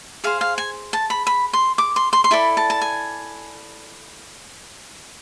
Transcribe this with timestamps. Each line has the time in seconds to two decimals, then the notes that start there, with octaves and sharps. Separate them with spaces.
0.24 G#4 C5 F5
0.41 F5
0.58 G#5
0.93 A5
1.10 B5
1.27 B5
1.53 C6
1.78 D6
1.96 C6
2.13 C6
2.24 C6
2.31 E4 A4 D5 B5
2.57 A5
2.70 A5
2.82 G#5